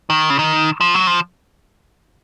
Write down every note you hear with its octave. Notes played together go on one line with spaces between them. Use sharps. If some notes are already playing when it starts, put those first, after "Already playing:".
D#3
C#3
D#3
F3
F#3
F3